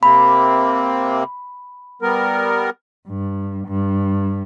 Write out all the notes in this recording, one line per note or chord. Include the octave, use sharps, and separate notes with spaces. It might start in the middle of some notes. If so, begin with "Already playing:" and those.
C3 A#3 C4 B5
G3 B3 A#4
G2
G2